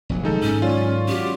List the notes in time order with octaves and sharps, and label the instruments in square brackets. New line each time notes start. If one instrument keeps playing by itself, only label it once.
[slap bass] F1 A#1 F#3
[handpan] D#3 [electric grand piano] G#3 D#4 A4
[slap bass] G#2 [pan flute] C#4
[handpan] F#3 C#5 D5 [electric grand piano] F4
[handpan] C#4 F#4 [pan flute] G4